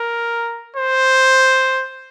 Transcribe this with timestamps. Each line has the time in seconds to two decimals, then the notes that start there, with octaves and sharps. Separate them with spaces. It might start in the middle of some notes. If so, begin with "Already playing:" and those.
Already playing: A#4
0.76 C5